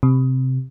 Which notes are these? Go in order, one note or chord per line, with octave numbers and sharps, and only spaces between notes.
C3